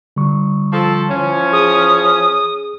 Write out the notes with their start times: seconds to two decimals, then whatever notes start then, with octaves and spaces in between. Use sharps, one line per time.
0.16 D3 G3 C#6
0.73 F3 A4
1.10 E3 F3 C#4
1.53 G#4 D#6